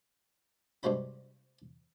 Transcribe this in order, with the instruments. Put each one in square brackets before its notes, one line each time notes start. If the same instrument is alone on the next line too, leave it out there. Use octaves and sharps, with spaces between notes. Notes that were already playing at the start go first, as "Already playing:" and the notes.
[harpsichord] G2 C3 G#3 F#4 C5 B5